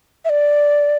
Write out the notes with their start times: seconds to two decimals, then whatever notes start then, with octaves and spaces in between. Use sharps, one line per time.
0.25 E5
0.29 D5